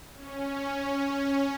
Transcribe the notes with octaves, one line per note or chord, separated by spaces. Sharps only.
C#4